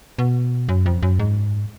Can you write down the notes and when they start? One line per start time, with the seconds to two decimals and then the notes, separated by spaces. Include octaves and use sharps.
0.18 B2
0.69 F#2
0.86 F2
1.02 F#2
1.19 G#2